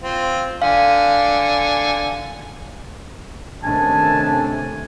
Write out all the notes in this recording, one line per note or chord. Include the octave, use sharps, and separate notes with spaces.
C4 F4
D3 F5 G#5
C3 D#3 A3 C#4 D4 G#5 A5